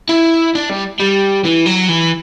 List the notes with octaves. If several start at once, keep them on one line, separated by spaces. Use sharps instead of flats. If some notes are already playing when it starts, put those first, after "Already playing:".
E4
D4
G3
G3
E3
F#3
E3